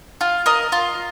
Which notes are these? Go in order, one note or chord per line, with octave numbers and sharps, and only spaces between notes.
F4
A#4 D#5
F4